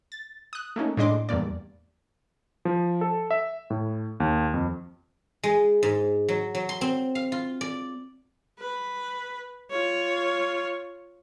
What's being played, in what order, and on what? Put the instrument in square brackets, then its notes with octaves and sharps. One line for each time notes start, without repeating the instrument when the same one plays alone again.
[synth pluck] A6
D#6 F#6
A3 A#3 C#4 D#4
A2 G#3 D4 D#5 C6 D6
E2 G2 A#3 D5
[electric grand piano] F3
A4
E5
A2
D#2
F2
[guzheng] G#3
G#2
F#3
F#3
C6
C4
F5
F4
D5
[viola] B4
F4 C#5